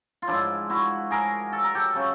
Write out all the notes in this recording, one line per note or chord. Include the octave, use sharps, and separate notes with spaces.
F4
G#2 F3 D4 E4
E4 F#4
G#4 A#4
A4
A#4
G4 A4
C#3 F#3